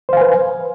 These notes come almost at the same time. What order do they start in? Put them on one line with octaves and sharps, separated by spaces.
C5 F5 G#5 B4